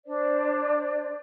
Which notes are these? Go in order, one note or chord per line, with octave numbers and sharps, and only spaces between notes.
D4 C5 D5